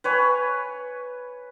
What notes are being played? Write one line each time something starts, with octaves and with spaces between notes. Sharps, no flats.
B4 C#5 G#5